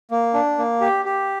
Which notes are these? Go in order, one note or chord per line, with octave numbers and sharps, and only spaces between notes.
A#3
D4
A#3
G4
G4